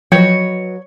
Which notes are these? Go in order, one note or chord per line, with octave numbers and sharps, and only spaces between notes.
F3 F#3 B4 C#5 D#5 G5 G6